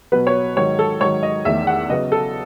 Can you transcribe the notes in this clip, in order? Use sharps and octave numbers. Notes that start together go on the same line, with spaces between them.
B2 F#3 B3 B4
C#5
G#2 D#3 F#3 C#5
A4
G#2 D#3 F#3 C#5
D#5
E2 D#3 A3 E5
F#5
C#3 F#3 B3 D#5
A4